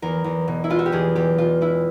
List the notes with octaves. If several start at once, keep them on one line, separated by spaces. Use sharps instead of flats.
E2 A#4
E2
B2
E4
G#3 F4
F#4
G4
E2 G#4
E2 G4
B2 F4
G#3 E4